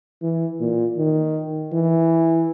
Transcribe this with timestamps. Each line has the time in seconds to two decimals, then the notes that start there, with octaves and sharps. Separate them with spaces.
0.22 E3
0.60 A#2
0.98 D#3
1.73 E3